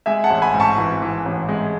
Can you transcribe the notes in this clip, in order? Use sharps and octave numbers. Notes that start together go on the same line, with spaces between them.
G#3 E5 G#5
F#5 A5
A1
G#5 B5
G#2
A5 C#6
E3
E3
A1
G#3